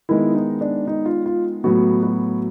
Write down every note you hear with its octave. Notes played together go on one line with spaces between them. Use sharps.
D#3 G#3 B3 E4
D#4
D4
D#4
F4
F4
A2 F#3 B3 F#4
F#4